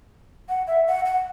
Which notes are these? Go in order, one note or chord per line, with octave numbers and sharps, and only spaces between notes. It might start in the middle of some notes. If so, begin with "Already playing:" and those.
F#5
E5
F#5
F#5